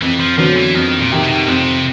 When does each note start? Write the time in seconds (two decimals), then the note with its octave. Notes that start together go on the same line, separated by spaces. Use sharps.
0.02 F2 E3
0.20 F3
0.38 D3 F3 F#3 B3
0.57 E3
0.74 F2 D#3
0.99 A#2
1.11 C3 D#3
1.23 B2
1.47 F2 C3